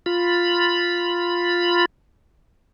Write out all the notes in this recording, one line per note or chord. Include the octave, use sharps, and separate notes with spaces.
F4 B5